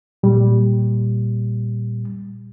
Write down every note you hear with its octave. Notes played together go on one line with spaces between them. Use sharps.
A#2 G3